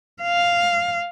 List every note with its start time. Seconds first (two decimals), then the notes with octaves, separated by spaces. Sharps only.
0.22 F5